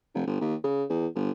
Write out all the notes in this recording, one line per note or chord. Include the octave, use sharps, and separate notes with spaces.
F1
G1
D#2
C#3
E2
G1